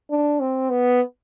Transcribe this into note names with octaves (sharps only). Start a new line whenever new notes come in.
D4
C4
B3